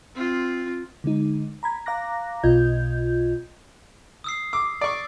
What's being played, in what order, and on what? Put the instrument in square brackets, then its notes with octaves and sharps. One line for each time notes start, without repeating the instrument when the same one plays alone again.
[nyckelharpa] C4 F4
[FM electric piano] D3 G#3 D#4
A#5 B5 G#6
F5 A#5 D6 F#6 A#6
B1 B2 F4 D#5 G6 G#6
[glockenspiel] D#6 E6 C7
[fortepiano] D6 [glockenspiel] E6
[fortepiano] D5 C#6